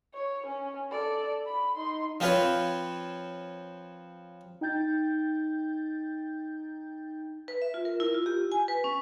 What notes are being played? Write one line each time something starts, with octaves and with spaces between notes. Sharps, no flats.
C#5
C#4
A4 D5
B5
D#4 C6
F3 C4 F4 B4 C#5
D#4 G5 G6 A6
B4
E5
F4
A#4
E4
F4
G4
G#5
B4
C#4